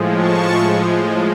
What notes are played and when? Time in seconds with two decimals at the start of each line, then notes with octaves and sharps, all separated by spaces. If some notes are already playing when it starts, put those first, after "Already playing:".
Already playing: A2 F3 G#3
0.15 A5 C#6